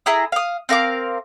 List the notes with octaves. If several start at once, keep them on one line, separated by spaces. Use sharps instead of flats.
E4 G#4 A#5 D#6
F5 D#6
C4 A#4 F5 D6